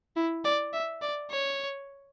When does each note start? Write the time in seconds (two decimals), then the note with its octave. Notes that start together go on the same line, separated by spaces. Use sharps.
0.16 E4
0.45 D5
0.73 E5
1.02 D5
1.31 C#5